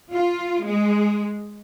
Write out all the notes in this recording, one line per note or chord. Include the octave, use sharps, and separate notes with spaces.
F4
G#3